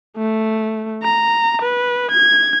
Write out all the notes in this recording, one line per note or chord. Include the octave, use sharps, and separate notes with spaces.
A3
A#5
B4
G#6